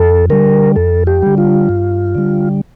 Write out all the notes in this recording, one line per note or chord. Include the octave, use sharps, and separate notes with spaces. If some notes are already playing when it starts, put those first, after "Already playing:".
Already playing: F2 A4
D3 G3 A#4
F2 A4
G4
D3 G3
F4
G2
D3 G3